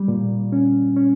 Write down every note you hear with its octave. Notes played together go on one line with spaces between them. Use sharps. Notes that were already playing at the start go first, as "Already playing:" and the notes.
Already playing: G3
A#2
C#4
C#4